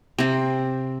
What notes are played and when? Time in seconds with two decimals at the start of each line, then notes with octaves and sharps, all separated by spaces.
0.18 C3 C4